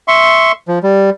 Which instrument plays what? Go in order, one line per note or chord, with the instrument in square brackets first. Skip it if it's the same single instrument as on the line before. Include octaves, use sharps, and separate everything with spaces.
[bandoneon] E5 C6 C#6
F3
G3